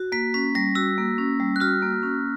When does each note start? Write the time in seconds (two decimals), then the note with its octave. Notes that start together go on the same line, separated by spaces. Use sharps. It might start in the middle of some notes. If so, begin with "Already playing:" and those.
Already playing: F#4
0.12 A#3 B6
0.34 C#4 B6
0.55 G3 A#6
0.75 F#4 E6
0.98 A#3
1.18 C#4
1.40 G3
1.56 F#6
1.60 F#4 F6
1.82 A#3
2.03 C#4